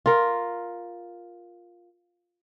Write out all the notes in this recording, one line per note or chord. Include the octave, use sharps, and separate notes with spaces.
F4 A#4